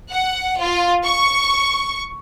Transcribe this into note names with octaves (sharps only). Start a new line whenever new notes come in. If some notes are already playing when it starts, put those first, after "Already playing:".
F#5
F4
C#6